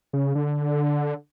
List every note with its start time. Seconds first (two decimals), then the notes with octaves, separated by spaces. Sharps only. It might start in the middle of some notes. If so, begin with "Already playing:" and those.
0.13 C#3
0.35 D3